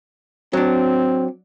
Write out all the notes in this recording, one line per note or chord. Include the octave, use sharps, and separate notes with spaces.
F#3 C4 D4